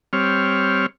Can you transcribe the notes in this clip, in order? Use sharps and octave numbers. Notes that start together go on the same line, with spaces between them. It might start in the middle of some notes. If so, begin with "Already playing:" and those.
G3 C4 C#5 F6